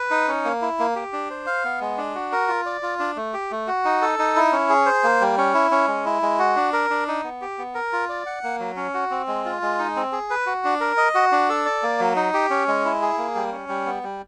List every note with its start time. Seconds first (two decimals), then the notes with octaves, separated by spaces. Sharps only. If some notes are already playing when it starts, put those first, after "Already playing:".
Already playing: B4
0.11 D#4
0.28 C#4
0.45 A#3
0.62 E4
0.79 A#3
0.96 G4
1.13 D4
1.30 C5
1.46 F5
1.65 B3
1.81 G#3
1.98 D4
2.15 F#4
2.32 A#4
2.48 F4
2.66 D5
2.83 F4
2.99 D4
3.16 A3
3.34 G4
3.51 A3
3.67 F#4
3.85 D#4
4.02 A4
4.19 D#4
4.36 E4
4.52 C#4
4.69 G#4
4.86 C5
5.03 A#3
5.21 G3
5.38 C#4
5.54 E4
5.71 C#4
5.88 G#3
6.05 E4
6.22 G#3
6.39 F#4
6.56 D4
6.73 A#4
6.90 D4
7.08 D#4
7.24 B3
7.41 G4
7.58 B3
7.75 A#4
7.93 F4
8.09 D5
8.26 F#5
8.43 A#3
8.59 F#3
8.76 C#4
8.94 F#4
9.10 C4
9.28 G#3
9.45 F4
9.62 G#3
9.79 D#4
9.96 C4
10.12 G#4
10.30 B4
10.46 F#4
10.64 D4
10.81 A#4
10.97 D#5
11.15 F#4
11.32 D4
11.49 A4
11.66 D5
11.83 A#3
12.00 F#3
12.16 D#4
12.34 G4
12.50 C#4
12.68 G#3
12.85 E4
13.02 G#4
13.18 A#3
13.35 G3
13.52 C#4
13.69 G3
13.86 B3
14.03 G3